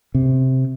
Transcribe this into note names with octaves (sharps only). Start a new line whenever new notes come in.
C3